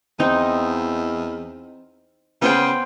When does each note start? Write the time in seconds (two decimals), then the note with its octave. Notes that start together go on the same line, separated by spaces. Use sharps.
0.20 E2 C4 D#4
2.42 C#3 B3 C5 G5